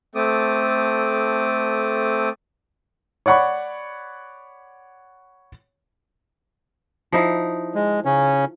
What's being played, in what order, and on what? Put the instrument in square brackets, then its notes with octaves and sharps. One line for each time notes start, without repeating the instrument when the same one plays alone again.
[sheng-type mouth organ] A3 C4 A4 D6 D#6
[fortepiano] C#5 D5 F#5 B5 C#6
[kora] F3 D#4 E4
[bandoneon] G#3
C#3 C#4